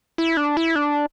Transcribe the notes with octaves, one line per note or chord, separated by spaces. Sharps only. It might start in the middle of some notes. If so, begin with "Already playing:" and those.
E4
D4
E4
D4